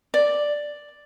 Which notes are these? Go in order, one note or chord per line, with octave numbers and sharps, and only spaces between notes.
D5